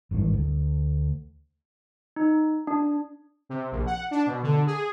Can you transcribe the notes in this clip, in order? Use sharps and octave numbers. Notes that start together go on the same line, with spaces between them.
G#1 G2 E3 G#3
D2
D#4
D4
C3
A#1
F#5
D4
B2
D3
G#4